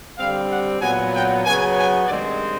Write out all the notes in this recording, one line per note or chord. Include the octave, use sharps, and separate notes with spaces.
D3 G3 C4 F5
F#5
A#2 F#3 B3 G#5
G5
C#3 F#3 B3 G#5
G#5
G2 D#3 G#3 C4 D5